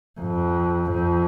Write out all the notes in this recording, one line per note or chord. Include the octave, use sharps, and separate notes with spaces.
F2
F2